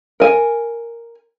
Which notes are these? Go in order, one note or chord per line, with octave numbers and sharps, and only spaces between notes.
A#4 G#5